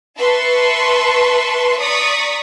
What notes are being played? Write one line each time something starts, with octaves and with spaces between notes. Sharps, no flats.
B4 E5 A5 C6 C#6
D5 A#5 C#6 D#6 B6